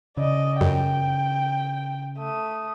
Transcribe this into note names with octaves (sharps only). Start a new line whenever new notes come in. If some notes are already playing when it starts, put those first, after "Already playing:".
C#3 D5 D#5
F#2 G5
A3 D#6